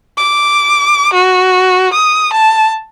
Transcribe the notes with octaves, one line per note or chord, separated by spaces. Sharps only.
D6
F#4
D#6
A5